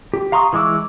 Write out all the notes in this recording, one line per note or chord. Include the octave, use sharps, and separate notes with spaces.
G4
F5 A#5 C6 C#6 D#6
E3 G#3 C#6 D6 E6